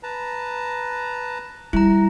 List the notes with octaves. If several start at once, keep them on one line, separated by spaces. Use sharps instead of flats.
B4 A5 A#5
G3 E4 A#5